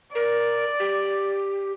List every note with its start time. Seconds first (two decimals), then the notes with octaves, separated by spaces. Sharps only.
0.15 A#4 D5
0.80 G4